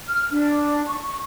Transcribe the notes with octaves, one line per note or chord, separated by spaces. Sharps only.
F6
D4
C#6